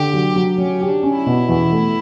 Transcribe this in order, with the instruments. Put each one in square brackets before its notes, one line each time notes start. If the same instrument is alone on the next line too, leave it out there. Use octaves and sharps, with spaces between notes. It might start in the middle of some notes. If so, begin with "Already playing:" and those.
Already playing: [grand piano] D3 [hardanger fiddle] G4
[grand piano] F#3
F#3
[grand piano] F#3 [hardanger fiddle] C#4
[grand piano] G4
[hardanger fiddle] D4
[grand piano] C#4
[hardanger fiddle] E4
[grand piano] B2
E2
A3